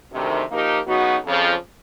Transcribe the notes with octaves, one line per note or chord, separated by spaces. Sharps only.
D2 C3 D#3
F3 A#3 D#4 G4 A#4
C#3 F#3 B3 D#4 F#4
F2 C#3 F3